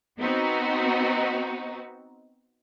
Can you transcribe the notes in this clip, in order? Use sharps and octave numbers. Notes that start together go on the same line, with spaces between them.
B3 C4 D#4 F#4